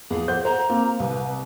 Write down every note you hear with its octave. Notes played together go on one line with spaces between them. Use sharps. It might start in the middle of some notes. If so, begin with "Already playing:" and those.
E2 F3 G#4
C5 F#5 G6
C5 A#5
A#3 C4
C2 B4